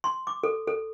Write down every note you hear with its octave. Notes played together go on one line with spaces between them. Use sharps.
C6
D6
A4
A4